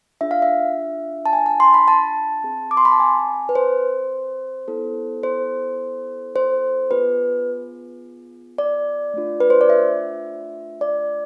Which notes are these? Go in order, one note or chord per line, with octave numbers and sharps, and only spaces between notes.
D4 F4 G#4 E5
F5
E5
A5
G#5
A5
C6
B5
A5
C4 G#4
D6
C6
B5
A5
G#5
B4
C5
B3 E4 A4
C5
C5
B3 F4 G#4 B4
D5
A3 D4 F4
B4
C5
D5
E5
D5